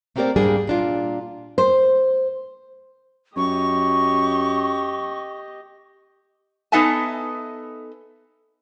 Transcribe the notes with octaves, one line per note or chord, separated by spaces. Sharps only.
A3 A#3 C4 G4 A#4 D5
G#2 G3 A#3 D4 G#4
A#2 D4 F4
C5
F#2 G4 D#5 C#6
B3 D#4 A4 E5 G#5 A5